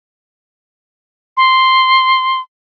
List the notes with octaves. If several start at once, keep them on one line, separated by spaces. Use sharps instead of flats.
C6